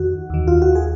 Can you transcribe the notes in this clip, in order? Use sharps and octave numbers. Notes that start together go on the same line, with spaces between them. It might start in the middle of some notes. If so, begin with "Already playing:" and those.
Already playing: F2 D#3 F#4
D#2 D#3
F4
F#4
G#4